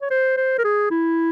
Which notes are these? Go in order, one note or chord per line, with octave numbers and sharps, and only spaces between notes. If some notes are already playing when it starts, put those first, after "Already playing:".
C#5
C5
C5
A#4
G#4
E4